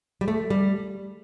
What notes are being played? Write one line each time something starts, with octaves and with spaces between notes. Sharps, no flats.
G3
A3
G3